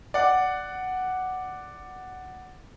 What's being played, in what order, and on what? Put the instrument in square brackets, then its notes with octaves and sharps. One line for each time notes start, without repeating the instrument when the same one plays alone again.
[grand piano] D5 F#5